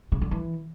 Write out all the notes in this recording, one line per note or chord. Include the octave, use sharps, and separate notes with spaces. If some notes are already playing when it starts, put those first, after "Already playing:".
C#3
D3
E3